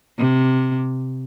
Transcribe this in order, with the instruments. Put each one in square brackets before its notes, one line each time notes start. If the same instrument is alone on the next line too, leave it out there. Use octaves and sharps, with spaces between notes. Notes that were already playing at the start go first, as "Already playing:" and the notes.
[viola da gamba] C3